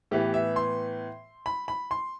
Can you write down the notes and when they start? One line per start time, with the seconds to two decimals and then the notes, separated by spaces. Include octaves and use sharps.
0.11 A2 E3 B3 G4
0.34 E5
0.56 C6
1.46 B5
1.68 B5
1.91 C6